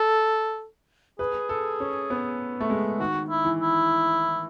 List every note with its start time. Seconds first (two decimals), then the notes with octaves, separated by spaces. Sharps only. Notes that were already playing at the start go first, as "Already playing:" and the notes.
Already playing: A4
1.19 G#4 B4
1.49 A4
1.80 C#4
2.10 B3
2.60 A3
2.70 G#3
3.00 D#3 F#4
3.30 E4
3.45 E3
3.61 E4